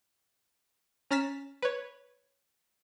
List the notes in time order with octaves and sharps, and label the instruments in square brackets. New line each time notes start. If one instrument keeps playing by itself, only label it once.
[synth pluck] C#4 A#5 F6 A6 B6 E7
B4 C#5